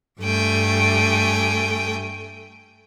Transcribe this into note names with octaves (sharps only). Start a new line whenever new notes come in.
G2 A3 G5 G#5